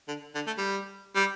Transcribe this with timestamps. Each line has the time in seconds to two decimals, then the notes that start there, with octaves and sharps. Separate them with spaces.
0.08 D3
0.35 D3
0.47 A3
0.58 G3
1.15 G3